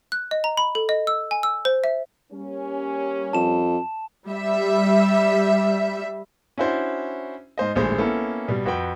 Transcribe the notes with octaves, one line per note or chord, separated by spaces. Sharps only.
F#6
D#5
A#5
B5
A4
D#5
E6
G#5
E6
C5
E5
G3 A#3 C#4
F2 A5 E7
G3 E5
C#4 D4 E4 F#4 C5 D5
G#2 C5 D#5
D#1 A#1 G#3 A3 C5
A#3 B3 C#4 E4 A4
B2 G3
F2 F#4 B4 G5